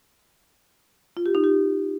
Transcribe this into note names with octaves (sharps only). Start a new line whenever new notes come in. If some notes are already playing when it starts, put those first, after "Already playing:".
F4
G4
D#4
G4